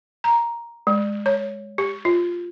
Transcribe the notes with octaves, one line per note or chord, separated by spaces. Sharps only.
A#5
G#3
C#5
G4
F4